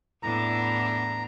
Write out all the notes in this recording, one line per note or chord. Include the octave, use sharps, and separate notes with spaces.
E2 A2 D4 A#5